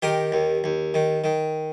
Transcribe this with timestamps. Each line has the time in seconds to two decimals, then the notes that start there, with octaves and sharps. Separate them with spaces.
0.02 D#3 G4 A#4
0.32 D#2
0.64 D#2
0.94 D#3
1.24 D#3